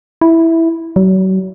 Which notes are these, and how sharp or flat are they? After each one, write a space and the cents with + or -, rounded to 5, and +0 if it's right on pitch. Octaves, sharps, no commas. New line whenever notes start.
E4 -5
F#3 +35